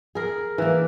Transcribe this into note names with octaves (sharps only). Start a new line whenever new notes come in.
G#4 A#4
E3 A#3